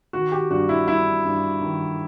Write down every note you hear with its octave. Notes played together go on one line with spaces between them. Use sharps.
D#3 F#4
G4
G2 F#4
E4
G2 E4
G2
D#3